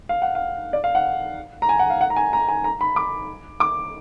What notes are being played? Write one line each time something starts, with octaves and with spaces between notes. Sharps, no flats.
F5
F#5
F5
D5
F5
F#5
A#5
G#5
F#5
F5
F#5
A#5
G#5
A#5
G#5
A#5
B5
D6
D6